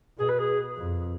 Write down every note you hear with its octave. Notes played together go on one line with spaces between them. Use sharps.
B2 G#4
B4
G#4
F2